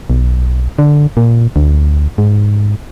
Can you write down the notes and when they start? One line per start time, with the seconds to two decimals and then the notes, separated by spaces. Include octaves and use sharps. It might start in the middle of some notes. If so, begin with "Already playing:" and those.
0.10 B1
0.79 D3
1.17 A#2
1.56 D2
2.18 G#2